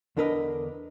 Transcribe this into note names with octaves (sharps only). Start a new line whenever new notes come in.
E2 D3 D4 A#4 B4 D#5